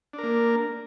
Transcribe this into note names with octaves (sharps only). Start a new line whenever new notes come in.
A#3 D4 A#4